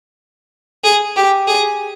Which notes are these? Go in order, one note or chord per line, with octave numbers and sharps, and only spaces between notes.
G#4
G4
G#4